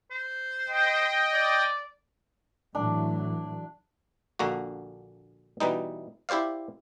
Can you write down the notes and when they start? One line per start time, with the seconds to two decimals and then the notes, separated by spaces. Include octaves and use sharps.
0.11 C5
0.68 D#5 G5
1.33 D5
2.75 A2 E3 F#3 D4
4.39 A#1 D3 A#3 F#4
5.60 B2 E3 G3 D#4
6.29 E4 G4 C5 D5 F5